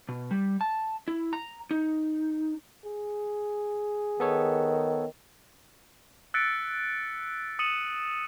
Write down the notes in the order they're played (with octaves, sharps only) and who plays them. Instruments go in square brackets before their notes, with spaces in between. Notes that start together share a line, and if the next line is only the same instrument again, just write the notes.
[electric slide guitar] B2
G3
A5
E4
A#5
D#4
[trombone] G#4
[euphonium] D#3 [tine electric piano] B3 A4 C#5
[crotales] E6 F#6 A6 B6 C#7 D7
D#6 C#7 D#7 E7 F#7